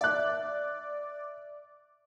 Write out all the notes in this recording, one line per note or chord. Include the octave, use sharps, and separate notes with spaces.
D5 E5 F#6